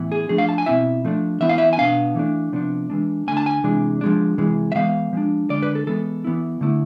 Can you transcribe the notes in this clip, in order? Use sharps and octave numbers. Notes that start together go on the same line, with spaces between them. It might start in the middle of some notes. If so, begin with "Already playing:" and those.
Already playing: A2 E3 B3 E4
G#4
F3 A3 D4 G#4
F5
A5
G#5
B2 A3 C4 E4 E5
F3 A3 D4
E3 B3 E4 E5
F5
E5
G#5
B2 B3 D4 F5
E3 A3 D4
C3 F3 B3 D4
E3 G#3 D4
D3 A3 D4 G#5
A5
G#5
C3 E3 G#3 D4
F3 G#3 D4
C3 E3 G#3
E5
E3 G#3 B3 F5
F3 G#3 D4
D3 G#3 D4 D5
B4
A4
E3 G#3 B3 A4
E3 B3 E4
D3 A3 E4